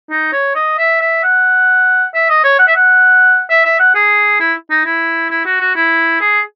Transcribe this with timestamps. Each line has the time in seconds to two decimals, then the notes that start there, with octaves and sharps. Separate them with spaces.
0.10 D#4
0.33 C#5
0.55 D#5
0.78 E5
1.01 E5
1.23 F#5
2.14 E5
2.29 D#5
2.44 C#5
2.59 F#5
2.68 E5
2.76 F#5
3.50 E5
3.65 E5
3.80 F#5
3.95 G#4
4.40 E4
4.70 D#4
4.85 E4
5.30 E4
5.45 F#4
5.60 F#4
5.75 E4
6.21 G#4